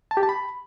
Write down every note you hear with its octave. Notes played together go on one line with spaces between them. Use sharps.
A5
G4
A5
B5